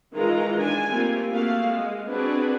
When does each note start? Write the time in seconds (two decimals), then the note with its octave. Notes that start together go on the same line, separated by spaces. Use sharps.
0.14 D#3 E3 G#3 F4 A#4 A#5
0.60 D4 G#5
0.89 G3 A3 A#3 C4 F4
1.31 A3 A#3 F#4 G#4 F5
1.67 G#3
2.09 C4 D4 F#4 G#4 B4